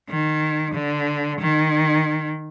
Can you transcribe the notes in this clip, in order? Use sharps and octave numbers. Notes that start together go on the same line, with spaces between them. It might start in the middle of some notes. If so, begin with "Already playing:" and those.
D#3
D3
D#3